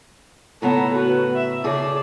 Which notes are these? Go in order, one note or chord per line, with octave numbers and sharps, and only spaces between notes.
A2 C#3 B3 A4 A#5
F#4 B4
E5
C#3 G#4 A4 D5